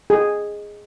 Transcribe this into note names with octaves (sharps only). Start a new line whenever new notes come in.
G#4